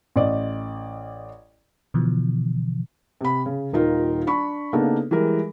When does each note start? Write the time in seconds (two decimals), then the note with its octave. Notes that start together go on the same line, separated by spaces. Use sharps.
0.16 A1 D5 D#5
1.94 B2 D3 E3 F3
3.21 C3 B5
3.46 C#3
3.72 D#1 D#3 D#4 F4 A#4
4.27 D4 B5 C#6
4.73 C#3 A#3 B3 D4 D#4 A4
5.11 E3 G3 G#3 A#4